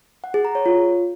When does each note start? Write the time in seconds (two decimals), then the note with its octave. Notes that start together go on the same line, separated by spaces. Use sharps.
0.24 F#5
0.34 G#4
0.45 A#5
0.55 C#5
0.66 F4